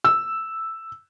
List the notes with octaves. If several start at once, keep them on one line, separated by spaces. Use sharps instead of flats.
E6